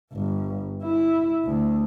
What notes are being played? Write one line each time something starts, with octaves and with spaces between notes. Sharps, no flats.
G1
E4
D2